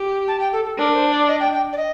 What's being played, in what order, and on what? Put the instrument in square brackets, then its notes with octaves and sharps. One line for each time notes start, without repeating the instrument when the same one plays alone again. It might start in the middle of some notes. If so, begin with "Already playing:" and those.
Already playing: [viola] G4
[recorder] A5
G5
A4
A4
[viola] D4 [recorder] A#4
[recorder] C5
D5
D#5
G5
G5
D5
D#5